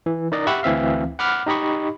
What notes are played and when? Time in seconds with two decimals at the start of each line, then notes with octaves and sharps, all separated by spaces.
0.06 E3
0.32 D#4 A#4 D5 D#5
0.47 G4 E5 F#5 B5 C#6 E6
0.63 D2 E3 C4 E5 F5
1.19 F#5 B5 D6 F6
1.47 D#4 G4 D#5 B5 C#6